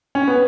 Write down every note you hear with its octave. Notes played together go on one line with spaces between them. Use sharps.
C#4
B3